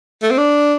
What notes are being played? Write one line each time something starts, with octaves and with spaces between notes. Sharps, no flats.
A3
C4
D4